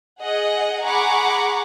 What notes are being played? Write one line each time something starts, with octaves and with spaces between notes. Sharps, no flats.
G#4 D#5 F#5
G#4 F#5 A#5 B5 C#6 D6